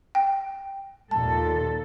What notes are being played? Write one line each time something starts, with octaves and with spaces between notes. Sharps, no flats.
G5
D#2 A#2 A4 A5